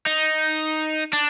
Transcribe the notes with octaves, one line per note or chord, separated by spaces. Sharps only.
D#4
D4